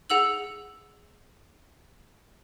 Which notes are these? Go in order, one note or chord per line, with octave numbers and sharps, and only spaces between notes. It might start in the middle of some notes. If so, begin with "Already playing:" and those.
G#4 F#5 E6 F#7